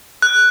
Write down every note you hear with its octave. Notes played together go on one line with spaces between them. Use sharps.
F#6